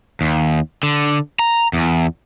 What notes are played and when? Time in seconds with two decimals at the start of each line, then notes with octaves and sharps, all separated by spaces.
0.21 D#2
0.83 D3
1.39 A#5
1.73 E2